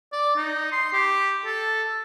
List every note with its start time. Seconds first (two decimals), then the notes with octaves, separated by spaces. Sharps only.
0.12 D5
0.36 D#4
0.72 C6
0.93 G4
1.46 A4